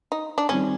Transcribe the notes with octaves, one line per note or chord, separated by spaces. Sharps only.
D#4
D4
D#3 G3 C4 C#4